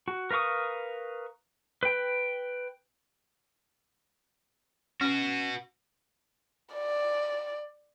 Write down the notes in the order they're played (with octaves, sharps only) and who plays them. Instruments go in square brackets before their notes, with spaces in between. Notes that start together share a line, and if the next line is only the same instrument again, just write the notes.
[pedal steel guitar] F#4
A#4 B4 F5 C#6 D#6
B4 G5
[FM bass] C#4 [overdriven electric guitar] F#4 B4
[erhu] D5